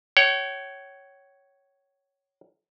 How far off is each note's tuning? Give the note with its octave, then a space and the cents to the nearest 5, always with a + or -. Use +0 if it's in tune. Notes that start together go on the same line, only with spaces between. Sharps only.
C#5 +0 G5 -45